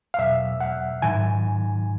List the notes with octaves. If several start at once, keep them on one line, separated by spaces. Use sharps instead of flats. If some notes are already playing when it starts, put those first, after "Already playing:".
F5
E2 B2 F#3 E5
F#5
G#2 D#3 F#3 G#5